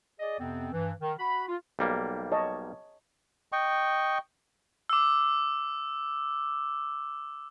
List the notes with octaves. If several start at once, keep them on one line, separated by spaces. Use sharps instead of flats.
G#4 D5 D#5
F2 C3 B3 C4
G2 E3
D#3
F#4 B5
F4
B1 G3 A#3
C#5 D#5 A5
D#5 G5 C#6
D6 E6